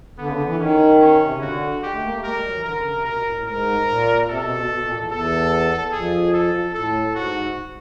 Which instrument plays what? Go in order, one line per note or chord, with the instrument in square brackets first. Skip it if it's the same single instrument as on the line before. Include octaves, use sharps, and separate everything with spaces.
[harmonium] D3 [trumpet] B3
[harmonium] C#3
D3
E3
[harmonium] D#3 [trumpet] C#4
[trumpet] C#4
[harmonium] C3
C#3
[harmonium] D3 [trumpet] F#4
[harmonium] G#3 [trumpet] G4
[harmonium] A3
A#3
A3
[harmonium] G#3 [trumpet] A#4
[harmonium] G3
F#3
E3
[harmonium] D3 [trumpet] A#4
[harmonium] C#3
C3
[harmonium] B2 [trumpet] A#4
[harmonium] B2
A2
A2
[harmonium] G#2 [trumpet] A#4
[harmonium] A#2
[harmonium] C3 [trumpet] A4
[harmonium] B2
B2
B2
A#2
E2
[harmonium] E2 [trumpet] A4
[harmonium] F2 [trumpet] G#4
[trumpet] A4
[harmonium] A2 [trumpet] A4
[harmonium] G#2 [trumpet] F#4